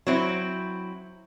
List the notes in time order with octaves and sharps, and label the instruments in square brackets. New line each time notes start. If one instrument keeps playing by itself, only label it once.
[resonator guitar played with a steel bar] F#3 C4 E4